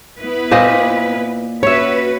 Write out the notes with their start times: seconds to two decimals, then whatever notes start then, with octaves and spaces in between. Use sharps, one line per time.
0.18 B3 E4 B4
0.51 A#2 C5 D#5
1.63 C#4 F#4 B4 C#5 E5